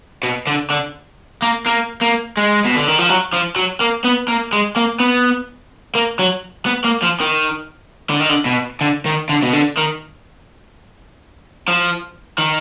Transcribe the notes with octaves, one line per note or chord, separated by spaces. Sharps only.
B2
D3
D3
A#3
A#3
A#3
G#3
B2
D3
D#3
F3
F#3
F3
F#3
A#3
B3
A#3
G#3
A#3
B3
A#3
F#3
B3
A#3
F3
D#3
D3
D#3
D3
B2
D3
D#3
D3
B2
D3
D#3
F3
D#3